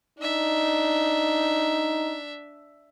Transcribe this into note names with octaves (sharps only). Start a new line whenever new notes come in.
D4 D#4 E5